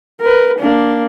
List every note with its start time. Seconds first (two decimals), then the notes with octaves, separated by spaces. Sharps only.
0.21 A#4 B4
0.59 A#3 D4